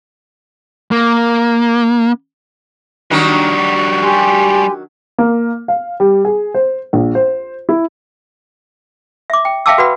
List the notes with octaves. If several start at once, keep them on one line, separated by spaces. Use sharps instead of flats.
A#3
D#3 F#3 G3 D4 F#4 C#6
G4 G#5 C6
A#3
F5
G3
G#4
C5
A#1
C5
E4
E5 D6
G5
E5 F5 G5 A5 D6 E6
F#4 B4 D5 F#5 B5